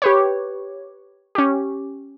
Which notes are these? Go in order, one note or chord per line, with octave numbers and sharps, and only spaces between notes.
G4 B4 C#5
C#4 G4